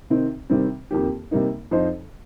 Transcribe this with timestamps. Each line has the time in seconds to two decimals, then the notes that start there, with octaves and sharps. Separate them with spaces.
0.10 C3 D#3 C4 D#4 C5
0.50 C3 D#3 G3 C4
0.91 F2 D#3 A#3 G4
1.31 C3 G3 A#3 D#4
1.71 F2 F3 D#4 C5 D#5